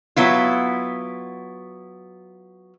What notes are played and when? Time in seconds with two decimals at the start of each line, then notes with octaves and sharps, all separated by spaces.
0.16 F#3 B3 E4 F4